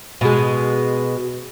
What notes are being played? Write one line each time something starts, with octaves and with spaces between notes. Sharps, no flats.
B2 G#3